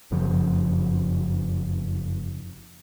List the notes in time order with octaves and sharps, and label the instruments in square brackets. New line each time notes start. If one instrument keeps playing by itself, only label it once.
[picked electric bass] F1 F#2 C#3 F3